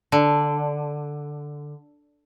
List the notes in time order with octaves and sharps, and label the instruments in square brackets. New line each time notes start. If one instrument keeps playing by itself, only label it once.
[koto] D3